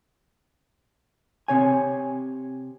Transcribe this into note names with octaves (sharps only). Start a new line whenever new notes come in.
C3 C#5 G#5